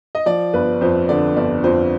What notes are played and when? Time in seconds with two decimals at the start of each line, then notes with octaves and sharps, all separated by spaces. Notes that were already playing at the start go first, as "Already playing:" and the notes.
0.15 D#5
0.26 F3 D5
0.53 G1 B4
0.81 F2 C5
1.09 D3 D5
1.36 G1 D5
1.64 F2 C5